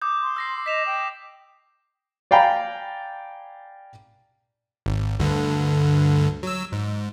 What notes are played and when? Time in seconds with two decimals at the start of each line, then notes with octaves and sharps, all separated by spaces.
0.02 D6 D#6 G6
0.22 C6
0.36 E6 A#6 C7
0.66 D#5 B6 E7 F7
0.86 G5
2.31 D5 F5 G5 G#5 A#5 B5
4.86 G#1
5.19 D2 G2 D3
6.43 F#3 E6
6.72 G#2